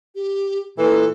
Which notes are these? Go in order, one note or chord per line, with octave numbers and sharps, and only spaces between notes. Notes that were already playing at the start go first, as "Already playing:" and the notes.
G4
A#2 E3 A4